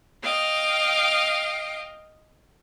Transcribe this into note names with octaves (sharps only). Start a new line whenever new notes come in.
D#5 F5 G5